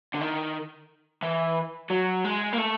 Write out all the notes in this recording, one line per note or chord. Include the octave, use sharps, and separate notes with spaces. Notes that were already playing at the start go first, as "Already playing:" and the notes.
D3
D#3
E3
F#3
G#3
A#3
A3